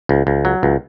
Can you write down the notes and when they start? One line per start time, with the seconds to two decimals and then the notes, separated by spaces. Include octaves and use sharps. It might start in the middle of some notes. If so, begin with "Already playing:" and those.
0.09 C#2
0.27 C#2
0.45 F#3
0.63 C#2